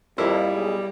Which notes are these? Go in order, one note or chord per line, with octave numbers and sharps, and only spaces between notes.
F2 G3 A#3 E4
B1 G#3 G#4